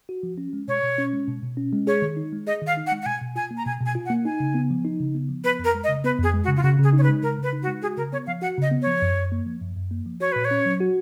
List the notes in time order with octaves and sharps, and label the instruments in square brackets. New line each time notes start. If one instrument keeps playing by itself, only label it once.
[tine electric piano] F#4
F3
C#4
G#3
[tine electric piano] B2 [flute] C#5
[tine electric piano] B2
C#4
G#3
B2
B2
C#4
G#3
[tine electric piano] G#4 [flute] C#5
[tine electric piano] D#3
D#4
G#3
[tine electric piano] G#4 [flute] D#5
[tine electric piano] D#3
[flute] F5
[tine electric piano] D#4
[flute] F#5
[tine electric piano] G#3
[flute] F#5
[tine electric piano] B2 [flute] G#5
[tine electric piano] B2
[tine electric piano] F4 [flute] G#5
[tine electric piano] A#3
[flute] A#5
[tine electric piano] B2 [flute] G#5
[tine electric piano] B2
[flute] G#5
[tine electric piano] F4
[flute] F#5
[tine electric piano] A#3
[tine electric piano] D#4 [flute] G#5
[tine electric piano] C#3
B3
F3
D#4
C#3
B3
F3
[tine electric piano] B3 [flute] B4
[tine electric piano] F2
[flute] A#4
[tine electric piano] G#3
[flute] D#5
[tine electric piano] C#3
[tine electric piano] B3 [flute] B4
[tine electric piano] F2 [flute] G#4
[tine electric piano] G#3
[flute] F#4
[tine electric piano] C#3
[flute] F4
[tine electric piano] C#3 [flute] F#4
[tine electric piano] C#3 [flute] G#4
[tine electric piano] D#4
[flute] C#5
B4
[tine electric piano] G#3
[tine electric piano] C#3 [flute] A#4
[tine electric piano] C#3
[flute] B4
[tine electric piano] D#4
[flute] F#4
[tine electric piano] G#3
[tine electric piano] F#4 [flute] G#4
[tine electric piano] C#3 [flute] A#4
[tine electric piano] B3 [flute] C#5
[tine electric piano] F3 [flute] F5
[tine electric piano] F#4 [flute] F#5
[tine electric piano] C#3 [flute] D#5
[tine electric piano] B3
[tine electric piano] F3 [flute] C#5
[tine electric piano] F#2
F#2
A#3
F3
F#2
F#2
A#3
F3
[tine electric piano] F#4 [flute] C#5
[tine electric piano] A#2 [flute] B4
[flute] C#5
[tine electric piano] C#4
F#3
F#4